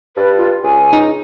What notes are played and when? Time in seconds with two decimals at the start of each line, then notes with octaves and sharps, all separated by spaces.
0.17 G2 B4
0.37 F4
0.63 C#2 G#5
0.93 D#4